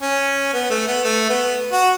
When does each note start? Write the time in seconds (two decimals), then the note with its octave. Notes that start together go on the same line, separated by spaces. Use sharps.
0.02 C#4
0.53 B3
0.70 A3
0.87 B3
1.04 A3
1.29 B3
1.72 F#4